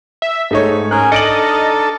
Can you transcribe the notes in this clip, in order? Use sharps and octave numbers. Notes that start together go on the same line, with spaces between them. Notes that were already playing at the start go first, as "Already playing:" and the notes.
E5
G#2 A3 D#4 C#5
C#4 G#4 A#4 F#6
D4 D#4 A4 D#5 F6 C#7 D7 F#7